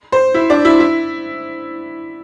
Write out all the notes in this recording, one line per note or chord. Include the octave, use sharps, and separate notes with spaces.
C5
E4
D4
E4
E4